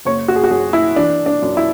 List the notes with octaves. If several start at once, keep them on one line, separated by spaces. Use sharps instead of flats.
F#1 C#5
F#4
G#4
F#4
F#2 G#4
E4
E3 D4
D4
F#2
E4